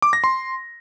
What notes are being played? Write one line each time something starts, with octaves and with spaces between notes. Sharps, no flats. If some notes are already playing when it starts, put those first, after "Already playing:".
D6
A#6
C6